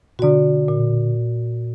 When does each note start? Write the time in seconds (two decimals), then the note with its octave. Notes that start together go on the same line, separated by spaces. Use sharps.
0.19 B2 D3 F#4 D5
0.68 A#2